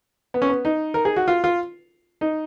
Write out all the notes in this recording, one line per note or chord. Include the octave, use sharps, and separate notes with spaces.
B3
C#4
B3
D#4
A#4
G#4
F#4
F4
F4
D#4